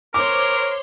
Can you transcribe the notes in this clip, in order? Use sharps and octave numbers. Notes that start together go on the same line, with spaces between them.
A#4 C5 C#5 C6 D6